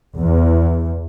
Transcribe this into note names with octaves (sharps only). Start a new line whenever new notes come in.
E2